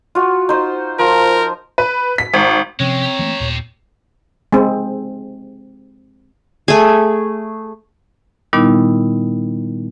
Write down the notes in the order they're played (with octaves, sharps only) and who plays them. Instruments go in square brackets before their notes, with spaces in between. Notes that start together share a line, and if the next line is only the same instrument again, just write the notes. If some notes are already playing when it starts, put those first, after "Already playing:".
[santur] F4 F#4
D#4 C5
[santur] F3 [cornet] A#4
[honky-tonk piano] B4
B6
G#1
[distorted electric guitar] F#2 G#3 [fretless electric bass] C3 F3 C#4 [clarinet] C4 [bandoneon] C#5
[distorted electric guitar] G4 A#5
[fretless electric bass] E3 A3 A#3
D#2 A#2
[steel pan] G#3 C4
[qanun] A3 G#4
[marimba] A#2 D#3 G3 B3 D#4 E4